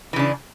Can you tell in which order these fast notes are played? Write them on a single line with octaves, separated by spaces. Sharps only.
E3 C#3 D4